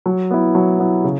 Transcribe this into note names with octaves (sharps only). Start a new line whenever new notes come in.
F#3
B3 E4
F#3
B3 E4
C#3